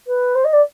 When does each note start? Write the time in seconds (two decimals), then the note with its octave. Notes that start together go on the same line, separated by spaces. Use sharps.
0.07 B4
0.34 C5
0.44 D#5
0.52 D5